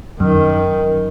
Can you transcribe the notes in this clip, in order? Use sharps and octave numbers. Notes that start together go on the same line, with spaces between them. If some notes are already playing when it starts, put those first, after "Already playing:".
F#2 D#3